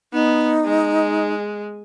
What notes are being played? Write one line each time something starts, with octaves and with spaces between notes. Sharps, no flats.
B3 D#4
G#3